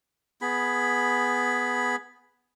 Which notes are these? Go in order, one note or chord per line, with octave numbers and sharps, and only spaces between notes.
B3 G#4 B5